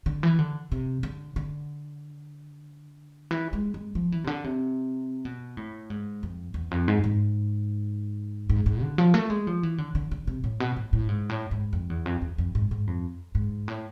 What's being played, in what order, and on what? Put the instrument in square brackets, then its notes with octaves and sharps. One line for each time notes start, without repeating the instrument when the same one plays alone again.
[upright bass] D3
E3
D3
C3
D3
D3
E3
G#3
G#3
F3
E3
C3
D3
C3
B2
A2
G#2
F2
E2
F2
G#2
G#2
G#2
G#2
D3
F3
A3
G#3
F3
E3
D3
D3
D3
C3
A2
B2
A2
A2
G#2
A2
G#2
F2
E2
F2
E2
F2
G#2
G#2
F2
G#2
A2